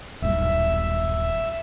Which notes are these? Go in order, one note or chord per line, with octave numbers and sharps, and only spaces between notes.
D#1 B1 G2 E5